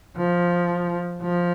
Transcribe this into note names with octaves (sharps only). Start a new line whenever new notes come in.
F3
F3